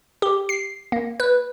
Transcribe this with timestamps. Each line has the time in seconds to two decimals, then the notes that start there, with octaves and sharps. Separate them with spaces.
0.22 G4
0.49 C7
0.92 A#3
1.20 B4